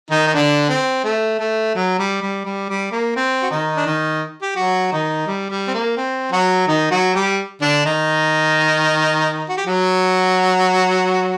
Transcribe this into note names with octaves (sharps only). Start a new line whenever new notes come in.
D#3 D#4
D#4
D3 D4
C4
A3
A3
F#3
G3
G3
G3
G3
A#3
C4
F#4
D#3 D#4
D4
D#3 D#4
G4
F#3 F#4
D#3 D#4
G3
G3
C4
A#3
C4
F#3 F#4
D#3 D#4
F#3 F#4
G3 G4
D3 D4
D#3 D#4
F#4
G4
F#3 F#4